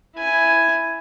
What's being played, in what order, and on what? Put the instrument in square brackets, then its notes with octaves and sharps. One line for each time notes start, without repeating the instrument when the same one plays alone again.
[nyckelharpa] E4 G#5